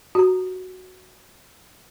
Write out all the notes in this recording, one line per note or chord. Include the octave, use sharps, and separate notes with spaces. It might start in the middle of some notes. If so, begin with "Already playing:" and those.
F#4 G4 A#5